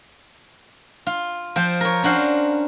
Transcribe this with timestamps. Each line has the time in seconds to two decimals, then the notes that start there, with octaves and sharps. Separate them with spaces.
1.07 F4
1.56 F3 C5 G5
1.81 A#4 C#5
2.03 C#4 D4 F#4 C5 F5